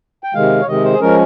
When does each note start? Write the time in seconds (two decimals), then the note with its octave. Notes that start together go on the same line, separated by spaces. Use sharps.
0.24 G5
0.34 C3 D#3 G#3 F5
0.61 C#5
0.67 C3 D#3 G#3 D#5
0.84 C5
0.93 G#4
1.01 F3 G#3 C#4 A#4